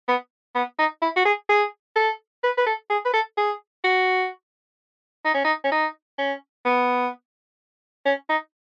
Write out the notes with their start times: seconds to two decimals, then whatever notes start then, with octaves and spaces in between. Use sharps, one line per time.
0.08 B3
0.55 B3
0.79 D#4
1.02 E4
1.16 F#4
1.25 G#4
1.49 G#4
1.96 A4
2.43 B4
2.57 B4
2.66 A4
2.90 G#4
3.05 B4
3.13 A4
3.37 G#4
3.84 F#4
5.25 D#4
5.34 C#4
5.44 D#4
5.64 C#4
5.71 D#4
6.18 C#4
6.65 B3
8.06 C#4
8.29 D#4